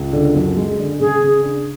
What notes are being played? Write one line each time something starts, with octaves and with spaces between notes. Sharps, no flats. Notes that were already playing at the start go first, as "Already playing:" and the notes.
Already playing: C#2
D3
F#2
G#3
D3
C#3 G#4
C#3
D4